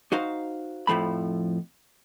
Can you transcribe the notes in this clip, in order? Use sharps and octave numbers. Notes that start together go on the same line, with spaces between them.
D#4 F#4 C5 F5
F2 A2 F3 A3 B5